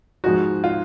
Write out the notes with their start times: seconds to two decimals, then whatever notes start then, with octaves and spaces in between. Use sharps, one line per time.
0.24 G#2 F3 G#3 F#4
0.64 F4